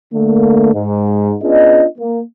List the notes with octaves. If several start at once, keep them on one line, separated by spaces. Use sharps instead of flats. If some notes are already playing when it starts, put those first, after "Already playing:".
D3 A3 A#3
G#2
B3 C#4 D4 F4 G#4 D#5
A#3